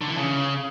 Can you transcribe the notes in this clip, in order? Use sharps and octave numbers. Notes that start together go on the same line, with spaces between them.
D3
E3
C#3